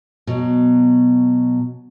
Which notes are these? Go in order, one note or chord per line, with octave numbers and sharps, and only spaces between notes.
B2 F#3